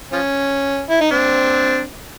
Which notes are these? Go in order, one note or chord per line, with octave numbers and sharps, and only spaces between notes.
F3 C#4
E4
D#4
C4 D4